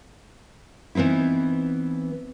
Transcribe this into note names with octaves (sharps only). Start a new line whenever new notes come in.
E3 B3 C4 D#4 E4